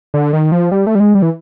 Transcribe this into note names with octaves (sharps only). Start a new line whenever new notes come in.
D3
D#3
F3
G3
A3
G3
G#3
G3
E3